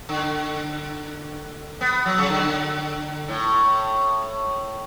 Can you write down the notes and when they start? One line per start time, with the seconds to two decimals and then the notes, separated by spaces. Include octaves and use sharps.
0.09 D3
1.81 B3
2.06 F#3
2.18 C#3
2.30 D3
3.28 A2